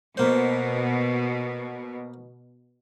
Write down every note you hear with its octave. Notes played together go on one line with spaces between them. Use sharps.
B2 A#3 C5